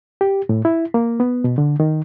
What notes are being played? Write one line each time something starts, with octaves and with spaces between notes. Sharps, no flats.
G4
A2
E4
A#3
B3
B2
D3
D#3